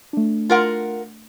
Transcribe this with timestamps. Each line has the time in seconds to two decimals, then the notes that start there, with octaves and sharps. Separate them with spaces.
0.13 A3 D4
0.49 F4 A#4 F#5